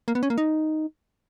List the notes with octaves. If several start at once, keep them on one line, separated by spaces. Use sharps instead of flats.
A#3
B3
C#4
A#3
D#4